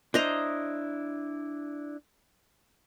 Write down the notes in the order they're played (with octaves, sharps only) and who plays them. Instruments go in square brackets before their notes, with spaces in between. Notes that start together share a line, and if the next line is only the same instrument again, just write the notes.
[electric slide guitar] D4 E4 [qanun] C5 D#5 A#5